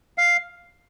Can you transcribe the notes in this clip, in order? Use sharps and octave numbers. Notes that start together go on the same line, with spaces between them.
F5